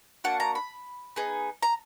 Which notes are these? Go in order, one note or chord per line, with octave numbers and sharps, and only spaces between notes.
A#3 D4 F#4 F#5
A#5
B5
B3 D#4 G#4
A#5